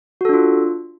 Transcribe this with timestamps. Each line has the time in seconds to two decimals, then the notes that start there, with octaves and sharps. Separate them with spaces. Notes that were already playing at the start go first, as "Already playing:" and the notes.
0.21 F#4
0.25 A4
0.29 D4
0.33 F4